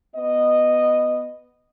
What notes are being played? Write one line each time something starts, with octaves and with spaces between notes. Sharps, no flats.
B3 D#5